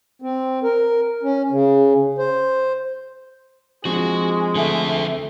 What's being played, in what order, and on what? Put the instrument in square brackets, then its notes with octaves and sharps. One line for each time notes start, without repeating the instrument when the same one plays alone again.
[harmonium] C4
A#4
C#4
C#3
C5
[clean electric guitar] F3 C4 D4 [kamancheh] G#3 [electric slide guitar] F#4
[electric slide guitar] D3 E5 [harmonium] A3